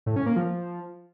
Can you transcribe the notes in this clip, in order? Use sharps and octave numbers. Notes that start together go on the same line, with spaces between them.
A2
C#4
A#3
F3